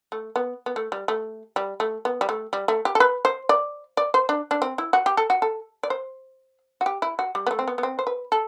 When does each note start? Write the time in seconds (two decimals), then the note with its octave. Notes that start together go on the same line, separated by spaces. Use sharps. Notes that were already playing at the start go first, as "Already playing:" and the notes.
0.12 A3
0.36 B3
0.66 B3
0.76 A3
0.92 G3
1.08 A3
1.56 G3
1.80 A3
2.05 B3
2.21 G3
2.29 A3
2.53 G3
2.68 A3
2.85 G4
2.95 A4
3.00 B4
3.25 C5
3.49 D5
3.97 D5
4.14 C5
4.29 D4
4.51 D4
4.62 C4
4.78 E4
4.93 F#4
5.06 G4
5.17 A4
5.30 F#4
5.42 A4
5.83 D5
5.90 C5
6.81 F#4
6.86 G4
7.02 E4
7.19 F#4
7.35 G3
7.47 B3
7.51 A3
7.59 C4
7.68 B3
7.78 B3
7.83 C4
7.99 C5
8.07 B4
8.32 A4